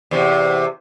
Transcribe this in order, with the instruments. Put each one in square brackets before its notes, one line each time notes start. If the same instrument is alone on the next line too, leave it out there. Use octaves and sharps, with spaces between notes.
[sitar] E2 C3